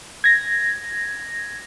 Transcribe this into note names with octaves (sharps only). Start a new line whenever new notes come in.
G#6 A#6